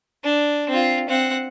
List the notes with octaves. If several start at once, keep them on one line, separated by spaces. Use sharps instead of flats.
D4
C4 F4
C4 F#5